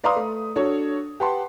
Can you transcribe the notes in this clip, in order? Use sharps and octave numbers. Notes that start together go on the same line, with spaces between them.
B4 D5 F5 A#5 C6 D#6
A3
D4 F#4 A4 C#5
G4 B4 F#5 A5 C6